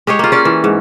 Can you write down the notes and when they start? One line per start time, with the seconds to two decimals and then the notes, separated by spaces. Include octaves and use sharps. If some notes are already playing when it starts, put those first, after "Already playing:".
0.07 G#3 G4 G#4 C#5
0.19 A#3 F4
0.32 C#4 D5
0.45 E3
0.64 G#2